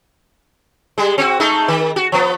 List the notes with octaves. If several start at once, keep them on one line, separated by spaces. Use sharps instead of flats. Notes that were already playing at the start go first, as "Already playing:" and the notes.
G3 G#3
C4 F#4
G#3 A3 D#4
D#3
F#4
F3 B3